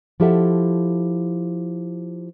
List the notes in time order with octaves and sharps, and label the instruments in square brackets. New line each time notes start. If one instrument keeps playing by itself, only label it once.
[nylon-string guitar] F3 E4 G4 A4 E5 F#5